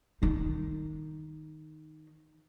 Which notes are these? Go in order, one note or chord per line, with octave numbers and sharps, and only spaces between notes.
D#3 D#4